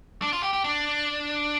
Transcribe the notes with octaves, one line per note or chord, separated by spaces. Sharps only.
D4
F4
G4
G4
D4